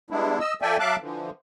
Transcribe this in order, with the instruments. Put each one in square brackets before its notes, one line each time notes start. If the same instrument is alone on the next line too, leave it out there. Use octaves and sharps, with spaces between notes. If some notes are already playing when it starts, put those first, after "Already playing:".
[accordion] G3 G#3 B3 D4 E4
D#5 E6
F3 A4 D5 E5 G5 G#5
F#3 E5 F5 A5 D6 F#6
D3 E3 F3